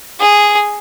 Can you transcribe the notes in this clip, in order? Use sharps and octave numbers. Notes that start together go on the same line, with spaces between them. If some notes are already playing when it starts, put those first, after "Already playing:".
G#4